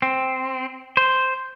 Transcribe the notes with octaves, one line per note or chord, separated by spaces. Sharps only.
C4
C5